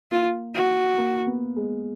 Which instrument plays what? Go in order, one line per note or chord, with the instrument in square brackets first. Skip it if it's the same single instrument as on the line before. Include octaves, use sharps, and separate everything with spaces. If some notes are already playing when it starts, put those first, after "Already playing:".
[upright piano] A#3 [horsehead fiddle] F4
[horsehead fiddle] F#4
[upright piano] A#3
B3
G#3